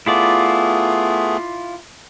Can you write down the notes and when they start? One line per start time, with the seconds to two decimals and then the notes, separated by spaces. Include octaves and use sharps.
0.06 A3 B3 E4 F4 G#4 D5